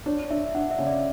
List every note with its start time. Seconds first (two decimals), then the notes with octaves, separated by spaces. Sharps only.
0.06 D4 C#5
0.31 D4 E5
0.55 D4 F#5
0.71 E5
0.79 C#3
0.87 D5